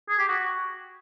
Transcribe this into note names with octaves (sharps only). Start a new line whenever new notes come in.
G#4
G4
F#4